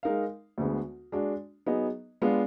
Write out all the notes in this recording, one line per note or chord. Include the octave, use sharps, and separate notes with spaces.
G#3 D#4 A#4 F5
D2 D3 G#3 B3
G#3 D4 F#4
F#3 B3 D#4 G#4 D#5
G#3 B3 D4 F4